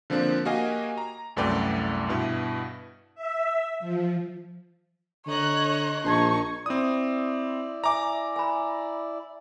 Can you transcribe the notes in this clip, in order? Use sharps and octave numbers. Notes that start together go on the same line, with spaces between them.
D3 F3 A#3 C4 D4
A#3 F#4 G4 D#5 F5 G#5
A#5
C2 F#2 A3 B4 D5 G5
G2 B2 E4
E5
F3
D3 C#5 D#5 A#5 F#6
A#1 D4 D#4 A5 C#6 G#6
C4 E4 D5 D#6
E5 G#5 A#5 D6
G#5 B5